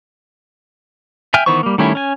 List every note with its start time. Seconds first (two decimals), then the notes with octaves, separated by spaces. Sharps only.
1.34 E5 G5 G#5 F6
1.46 D#3 E3 B3 C5 C#6
1.63 G3 A#3
1.78 D#3 G3 A3 C#4 E4
1.95 C#4 G#5